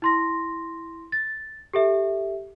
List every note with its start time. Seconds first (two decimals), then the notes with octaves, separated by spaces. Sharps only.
0.02 E4 C6 A#6
1.12 A6
1.74 G4 A4 E5